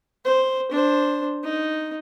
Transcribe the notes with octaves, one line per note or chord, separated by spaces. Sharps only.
C5
D4 C5
D#4